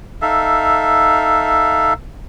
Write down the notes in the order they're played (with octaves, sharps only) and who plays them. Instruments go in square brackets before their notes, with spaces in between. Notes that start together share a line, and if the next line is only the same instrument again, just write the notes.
[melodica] D#4 A4 E5 F5